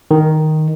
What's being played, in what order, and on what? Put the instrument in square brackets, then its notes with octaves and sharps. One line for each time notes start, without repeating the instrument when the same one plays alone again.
[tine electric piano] D#3